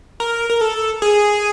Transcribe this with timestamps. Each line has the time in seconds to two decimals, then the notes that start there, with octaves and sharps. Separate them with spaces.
0.20 A#4
0.50 A#4
0.61 A4
1.02 G#4